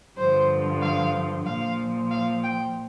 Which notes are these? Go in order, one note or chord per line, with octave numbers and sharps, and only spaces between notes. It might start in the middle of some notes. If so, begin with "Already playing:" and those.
G2 D3 F3 C5
F5
A#2 F3 F5
F5
G5